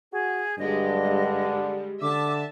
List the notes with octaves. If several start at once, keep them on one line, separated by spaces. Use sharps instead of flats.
F#4 G#4
G2 D3 F#3 G#3 G4 D#5
G3 G#3
D3 E5 A5 D6